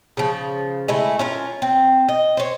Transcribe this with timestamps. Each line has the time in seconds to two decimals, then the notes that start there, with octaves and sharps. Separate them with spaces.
0.17 C#3 F3
0.88 G#3 A3 E4
1.19 C#4 F4 A#4
1.62 C4
2.09 D#5
2.37 C5 C#5